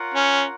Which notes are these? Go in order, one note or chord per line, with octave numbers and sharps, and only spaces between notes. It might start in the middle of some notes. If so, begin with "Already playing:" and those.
Already playing: F4 A#4 C#5 F#5
C#4